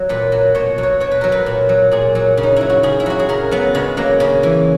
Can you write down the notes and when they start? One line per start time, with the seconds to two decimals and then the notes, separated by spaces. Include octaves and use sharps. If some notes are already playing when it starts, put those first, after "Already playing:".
Already playing: F#3 C#5
0.09 A#2 B4
0.32 F#3
0.55 B2 C#5
0.78 F#3
0.83 C#5
1.00 B2 C#5
1.11 B4
1.21 F#3 A#4
1.32 B4
1.46 A#2
1.69 F#3
1.91 A#2 G#4
2.15 F#3
2.37 C#3
2.43 D#4
2.56 F#3 E4
2.70 F#4
2.83 C#3 G#4
3.00 E4
3.06 F#3 F#4
3.19 G#4
3.29 C#3 A#4
3.51 F#3 B3
3.75 C#3 G#3
3.97 F#3 A#3
4.20 C#3
4.43 E3